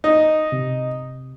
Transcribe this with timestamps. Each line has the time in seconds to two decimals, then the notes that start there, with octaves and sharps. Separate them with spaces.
0.04 D#4
0.52 C3